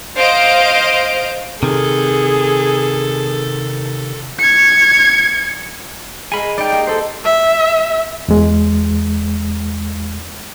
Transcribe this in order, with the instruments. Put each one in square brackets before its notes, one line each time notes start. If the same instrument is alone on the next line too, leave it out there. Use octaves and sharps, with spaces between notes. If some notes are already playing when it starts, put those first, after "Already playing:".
[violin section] C5 D#5 F5 D7
[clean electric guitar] C3 D#3 [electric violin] G#4 [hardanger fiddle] A4
[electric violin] G#6 C#7
[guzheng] G#3 A#4 F5 [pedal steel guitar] G#5 B5
[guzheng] D#4 [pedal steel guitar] D5 G5
[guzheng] A#3 G4
[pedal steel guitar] A4 C5
[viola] E5
[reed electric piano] E2 G#3